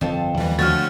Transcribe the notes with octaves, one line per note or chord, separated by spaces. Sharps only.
G1 F2 C4 A5
D#2 E3 G3
D3 F3 A3 F#4 C#5 F6 A6